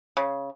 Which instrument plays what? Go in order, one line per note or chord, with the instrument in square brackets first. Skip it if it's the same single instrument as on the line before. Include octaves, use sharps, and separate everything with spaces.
[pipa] C#3